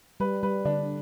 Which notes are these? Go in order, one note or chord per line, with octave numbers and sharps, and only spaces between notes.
G3 B4
G3 B4
D3 D4